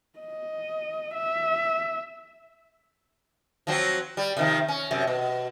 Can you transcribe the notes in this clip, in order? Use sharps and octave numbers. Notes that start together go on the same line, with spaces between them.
D#5
E5
F3 F#3 C4
G3
C3 D#3 F3
C#4
F#2 C3
B2